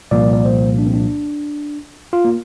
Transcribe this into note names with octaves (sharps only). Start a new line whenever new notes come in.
C2 A#2 F3 A#3 D5
D5
C5
D4
C4
D4
F4
A#3